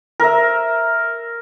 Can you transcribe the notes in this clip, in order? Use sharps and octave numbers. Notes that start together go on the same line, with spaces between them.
A#4 E5